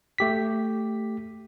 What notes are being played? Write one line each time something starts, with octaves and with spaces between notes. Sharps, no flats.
A3 G4 B6